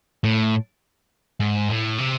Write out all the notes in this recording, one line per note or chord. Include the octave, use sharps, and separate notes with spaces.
A2
G#2
A2
C3